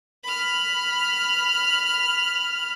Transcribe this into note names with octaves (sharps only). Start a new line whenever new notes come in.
B5 F6